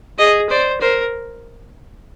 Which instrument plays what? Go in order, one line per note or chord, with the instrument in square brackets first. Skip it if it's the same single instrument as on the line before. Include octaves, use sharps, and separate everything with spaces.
[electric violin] G#4 [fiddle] D#5
[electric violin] C5 [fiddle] D5
[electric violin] A#4 [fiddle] C5